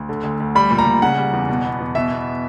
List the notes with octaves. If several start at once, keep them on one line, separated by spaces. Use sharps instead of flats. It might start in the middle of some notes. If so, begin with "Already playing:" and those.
Already playing: D2
D3
D2
D2
G3 B5
A#2
A#5
A#2
C#3 F#5
G3
E2
B2
B3
E2
B2 E5
B3